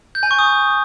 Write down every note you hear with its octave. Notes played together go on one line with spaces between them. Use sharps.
G6
G#5
C#6
D#6